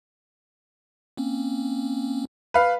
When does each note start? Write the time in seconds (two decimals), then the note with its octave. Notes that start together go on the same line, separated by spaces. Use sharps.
1.17 A#3 C4 C#4
2.54 B4 F5